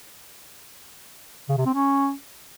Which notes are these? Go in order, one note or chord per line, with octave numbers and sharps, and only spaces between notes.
C#3
C3
C4
C#4